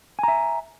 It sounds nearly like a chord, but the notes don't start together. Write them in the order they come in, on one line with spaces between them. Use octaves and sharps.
G#5 A#5 E5